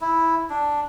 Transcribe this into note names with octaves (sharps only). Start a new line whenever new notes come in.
E4
D4